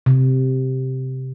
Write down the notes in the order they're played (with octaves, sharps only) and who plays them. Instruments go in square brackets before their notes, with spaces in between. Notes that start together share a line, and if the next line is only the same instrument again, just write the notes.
[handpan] C3